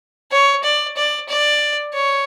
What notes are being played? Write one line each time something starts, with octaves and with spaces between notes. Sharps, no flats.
C#5
D5
D5
D5
C#5